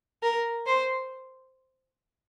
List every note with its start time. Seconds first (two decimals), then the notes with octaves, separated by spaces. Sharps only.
0.23 A#4
0.66 C5